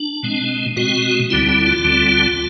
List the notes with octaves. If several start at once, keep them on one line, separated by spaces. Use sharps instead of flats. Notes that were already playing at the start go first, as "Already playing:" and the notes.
Already playing: D4
B2 G#3 C4
B2 G#3 C4 F#4
D2 D3 G3 C4 E4
E4
F4
D2 D3 G3 C4